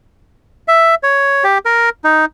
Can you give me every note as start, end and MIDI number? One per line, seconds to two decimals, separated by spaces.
0.68 0.95 76
1.03 1.44 73
1.44 1.58 67
1.65 1.89 70
2.04 2.25 63